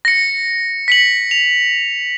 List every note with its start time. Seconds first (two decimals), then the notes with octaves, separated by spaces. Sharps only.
0.05 A#6 C#7
0.88 B6 C#7 F#7
1.31 F7